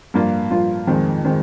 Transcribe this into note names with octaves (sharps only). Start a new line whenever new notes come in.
G2 F3 A#3 F4
G2 F3 A#3 F4
F2 D#3 G#3 C4
D#3 G#3 C4